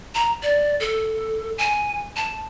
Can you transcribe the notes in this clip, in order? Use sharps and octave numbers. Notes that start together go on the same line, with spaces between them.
A#5
D5
A4
G#5
A5